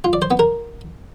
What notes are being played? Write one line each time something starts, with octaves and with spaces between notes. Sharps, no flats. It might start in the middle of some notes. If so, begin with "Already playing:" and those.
F4
D5
C5
B3
A#4